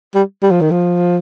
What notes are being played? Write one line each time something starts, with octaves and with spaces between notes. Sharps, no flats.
G3
G3
F3
D#3
F3